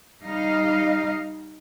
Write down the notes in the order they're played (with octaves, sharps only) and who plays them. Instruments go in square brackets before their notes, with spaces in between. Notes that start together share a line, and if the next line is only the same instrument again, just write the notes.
[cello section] G3 D#4 D#5 F5